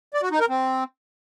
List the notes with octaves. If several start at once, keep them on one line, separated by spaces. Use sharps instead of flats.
D5
F#4
D#4
A#4
C4